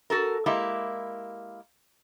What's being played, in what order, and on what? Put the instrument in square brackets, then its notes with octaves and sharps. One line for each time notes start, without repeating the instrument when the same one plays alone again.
[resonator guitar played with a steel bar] F#4 A4 A#4
G#3 A#3 E4 G4